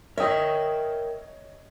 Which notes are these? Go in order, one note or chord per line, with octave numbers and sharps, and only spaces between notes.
A#4 C#5 D#5 E5 G5